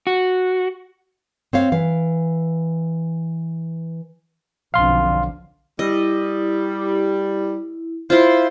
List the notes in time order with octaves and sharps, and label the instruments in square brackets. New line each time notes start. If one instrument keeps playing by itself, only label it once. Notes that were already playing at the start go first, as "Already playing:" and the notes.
[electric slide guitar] F#4
[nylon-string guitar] C4 C#5 F5
E3 F5
[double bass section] B1 F2 D3 [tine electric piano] F5 C6
[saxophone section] G3 [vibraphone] E4 [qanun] D#5
[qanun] E4 F4 [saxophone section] C5